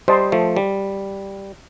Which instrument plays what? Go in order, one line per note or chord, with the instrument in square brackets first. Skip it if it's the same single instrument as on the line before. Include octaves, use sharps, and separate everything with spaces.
[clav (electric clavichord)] G3 [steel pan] C5 D#5 A5 C6
[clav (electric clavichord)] F3 A3
G3